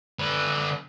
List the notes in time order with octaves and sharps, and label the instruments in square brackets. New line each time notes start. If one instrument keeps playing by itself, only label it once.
[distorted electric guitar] D3 B4